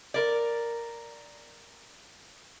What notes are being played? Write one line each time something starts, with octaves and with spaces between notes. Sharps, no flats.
A#4 D5